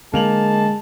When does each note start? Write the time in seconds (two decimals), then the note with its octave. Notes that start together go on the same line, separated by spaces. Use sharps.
0.14 D3 G#3 A#3 A5 F7 F#7